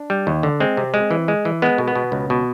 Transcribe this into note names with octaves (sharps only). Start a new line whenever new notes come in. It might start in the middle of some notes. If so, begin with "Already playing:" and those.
Already playing: D4
G3
D#2
D3
G#3 C4
C3
G#3
E3
G#3
E3
G#3 B3
B2
B3
B2
C#2
B2